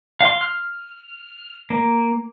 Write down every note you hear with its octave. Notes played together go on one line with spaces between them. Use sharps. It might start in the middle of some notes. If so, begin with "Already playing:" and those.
F5 C6
F6
A#3